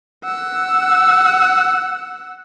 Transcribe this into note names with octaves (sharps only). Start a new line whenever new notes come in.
F#5 E6